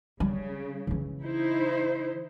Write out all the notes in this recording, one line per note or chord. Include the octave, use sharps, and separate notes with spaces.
C#3 G3
C#3 E3
D#4 E4 C5